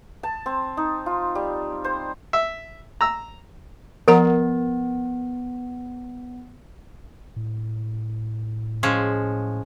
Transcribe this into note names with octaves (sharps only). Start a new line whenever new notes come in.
A5
C4
D#4
F4
G3
C5
E5
A#5 E6
F3 B3 A#4 F#5 A#5
A2
F3 G#3 C#4